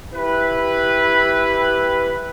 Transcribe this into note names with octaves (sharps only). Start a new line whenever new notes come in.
E4 G4 B4